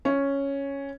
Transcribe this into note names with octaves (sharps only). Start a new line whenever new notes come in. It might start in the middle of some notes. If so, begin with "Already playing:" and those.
C#4